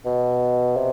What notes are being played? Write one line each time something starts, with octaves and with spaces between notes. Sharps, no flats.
B2
C3